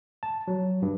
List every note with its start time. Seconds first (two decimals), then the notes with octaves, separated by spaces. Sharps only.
0.23 A5
0.48 F#3
0.82 G2